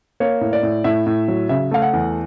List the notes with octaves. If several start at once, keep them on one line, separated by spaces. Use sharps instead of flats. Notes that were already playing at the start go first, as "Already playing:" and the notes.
A#3 C#5
A2
D5
A2
A2 E5
A2
F#3
C#3 E5
A3 F5
F#5
E2